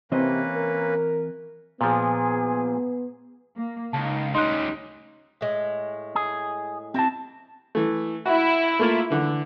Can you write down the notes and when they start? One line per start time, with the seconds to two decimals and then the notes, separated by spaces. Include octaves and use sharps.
0.12 C3 E3 A#3 C4 C#4 B4 D#5
0.55 A#4
1.81 A#2 F3 B3 G#4
3.57 A#3
3.93 C#2 D#4 F5 A5
4.35 D2 G3 C#4 D#4 C6 F#6
5.41 A2 G#3
6.15 G#4
6.94 G3 C4 E4 A5
7.75 E3 A3
8.26 E4 F#4
8.79 A3 A#3 F4
9.10 D3 E3